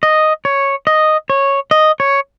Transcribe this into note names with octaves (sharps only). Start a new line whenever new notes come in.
D#5
C#5
D#5
C#5
D#5
C#5